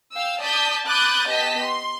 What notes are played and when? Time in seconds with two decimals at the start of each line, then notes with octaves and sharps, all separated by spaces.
0.13 F5 G5 E6
0.41 D5 A5 D#6 G6 B6
0.87 B5 D6 D#6 F#6 G6 A6
1.28 B3 G4 D#5 A5 B6
1.63 C6